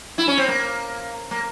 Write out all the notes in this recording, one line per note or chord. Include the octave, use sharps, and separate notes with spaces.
E4
C#4
C4
A#3
A#3